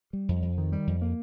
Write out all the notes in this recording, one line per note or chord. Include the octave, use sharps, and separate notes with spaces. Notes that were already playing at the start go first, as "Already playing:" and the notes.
G3
F2
F2
D#3
G3
F2
A#3